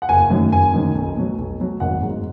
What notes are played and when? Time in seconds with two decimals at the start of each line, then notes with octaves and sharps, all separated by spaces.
0.02 F#5
0.09 F#1 G#5
0.30 F#2 D#3 F#3
0.52 F#1 G#5
0.73 F#2 D#3 F#3
0.95 B1
1.17 B2 F#3
1.38 B1
1.60 B2 F#3
1.80 G#1 F#5
2.03 G#2 F#3